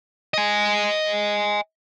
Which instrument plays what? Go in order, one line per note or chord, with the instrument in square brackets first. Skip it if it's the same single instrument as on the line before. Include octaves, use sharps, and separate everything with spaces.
[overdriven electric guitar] D#5 G#5